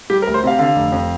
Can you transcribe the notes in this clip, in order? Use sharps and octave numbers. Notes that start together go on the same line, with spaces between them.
G3 G4
A#4
D2
C5
C3 F5
D3 F5
F1
F2